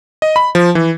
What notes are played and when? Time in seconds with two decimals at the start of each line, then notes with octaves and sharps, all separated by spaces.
0.22 D#5
0.36 B5
0.55 F3
0.75 E3